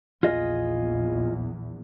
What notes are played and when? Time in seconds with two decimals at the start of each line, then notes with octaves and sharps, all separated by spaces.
0.23 A#1 E2 F4 G#4 D#5